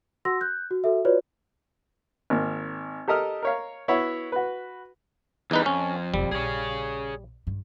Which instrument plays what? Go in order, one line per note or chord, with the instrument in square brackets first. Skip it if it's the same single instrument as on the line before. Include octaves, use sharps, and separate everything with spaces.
[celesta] F#4 F#5 C6 E6 A#6
F#6 G6
F#4
F#4 A4 E5
F4 F#4 B4 C#5 D5
[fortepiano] G#1 A#3
G4 A4 A#4 D#5 D#6 F6
A#4 C#5 F5
B3 E4 F#4 C#5
F#4 B4
[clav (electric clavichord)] E2 D#4 B4 [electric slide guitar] E3 G3
[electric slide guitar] F2 [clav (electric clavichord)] C#4
[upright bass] E1 C3 [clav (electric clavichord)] G3
[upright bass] A#1 [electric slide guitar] G#4 C#5
[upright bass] G2